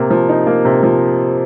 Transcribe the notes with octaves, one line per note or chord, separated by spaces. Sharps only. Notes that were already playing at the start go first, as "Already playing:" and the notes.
Already playing: C3 A#3
F3
D#4
A#3
C3
F3